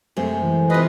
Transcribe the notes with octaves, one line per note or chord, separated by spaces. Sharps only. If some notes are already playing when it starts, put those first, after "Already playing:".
F#2 C3 G#3 A3
E3
C3 F4 B4 D#5